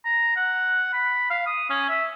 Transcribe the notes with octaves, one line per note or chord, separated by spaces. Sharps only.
A#5
F#5
B5
F5
D#6
C#4
E5